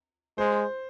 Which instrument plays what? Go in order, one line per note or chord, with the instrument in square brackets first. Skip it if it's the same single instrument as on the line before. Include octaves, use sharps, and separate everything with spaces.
[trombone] G#3 [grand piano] C5